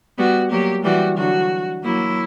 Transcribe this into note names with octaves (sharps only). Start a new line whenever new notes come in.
G3 B3 F#4
F#3 A#3 G4
E3 G3 F#4
D3 F#3 F#4
F#3 A#3 E4